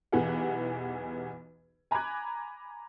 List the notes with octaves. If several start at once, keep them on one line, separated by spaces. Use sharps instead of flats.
B1 E2 E3 G4 G#4 F#5
G#5 A#5 B5 D6 F#6 G#6